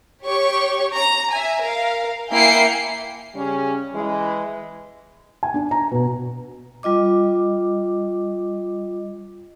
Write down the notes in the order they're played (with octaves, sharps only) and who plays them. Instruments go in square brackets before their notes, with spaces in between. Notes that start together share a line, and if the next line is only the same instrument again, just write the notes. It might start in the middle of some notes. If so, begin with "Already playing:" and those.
[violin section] G4 C#5 C#6
A#5
E5 G#5
A#4 F5
A#3 E4 G5 G#5 C7 C#7
[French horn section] C#3 G3 C#4
E3 G#3 E4
[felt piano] G#5
D4
A#5
B2
[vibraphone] G3 F4 D#5 D6